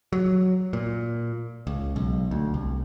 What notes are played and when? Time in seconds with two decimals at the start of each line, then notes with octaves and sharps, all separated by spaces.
0.13 F#3
0.73 A#2
1.67 C#2
1.96 B1
2.31 D2
2.54 C2